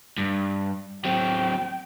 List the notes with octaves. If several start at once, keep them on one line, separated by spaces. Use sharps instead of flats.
G2
F#3 C4 G5